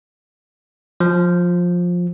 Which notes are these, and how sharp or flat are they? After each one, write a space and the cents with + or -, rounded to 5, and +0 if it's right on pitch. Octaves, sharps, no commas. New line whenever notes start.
F3 +15